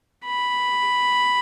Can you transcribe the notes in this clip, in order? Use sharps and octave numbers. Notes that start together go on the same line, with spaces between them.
B5